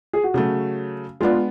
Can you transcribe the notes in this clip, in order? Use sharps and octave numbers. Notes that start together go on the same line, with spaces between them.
G#4
F#4
C#3 F#3 A3
G#3 B3 D4 F4